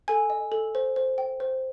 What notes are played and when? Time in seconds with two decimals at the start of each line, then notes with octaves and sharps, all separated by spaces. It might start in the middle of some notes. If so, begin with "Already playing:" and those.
0.08 A4 G#5
0.30 D#5
0.52 A4
0.75 C5
0.96 C5
1.18 G5
1.40 C5